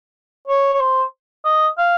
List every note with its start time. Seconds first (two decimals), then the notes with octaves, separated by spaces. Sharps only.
0.48 C#5
0.73 C#5
0.80 C5
1.44 D#5
1.78 F5